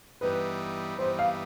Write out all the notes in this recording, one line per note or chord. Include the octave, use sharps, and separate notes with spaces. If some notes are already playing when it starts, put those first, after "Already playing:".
G2 E3 G3 B3 D#4 B4
G2 E3 G3 B3 D#4 C5
F5